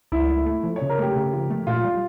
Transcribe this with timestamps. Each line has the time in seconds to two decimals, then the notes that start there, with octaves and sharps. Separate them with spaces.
0.12 C#2 E4
0.29 A3
0.46 A3
0.64 F3
0.76 C#5
0.82 C#3
0.90 A#4
0.99 A3 G4
1.16 C#3
1.33 F3
1.50 A3
1.67 A#2 F4
1.85 G3